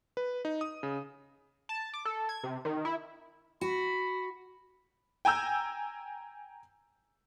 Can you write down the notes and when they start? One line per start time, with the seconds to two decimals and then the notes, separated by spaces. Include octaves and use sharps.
0.17 B4
0.45 D#4
0.61 D#6
0.83 C#3
1.69 A5
1.94 D6
2.05 A4
2.29 G#6
2.43 C3
2.65 D#3
2.85 E4
3.61 F#4 B5
5.25 G5 G#5 A#5 E6 G6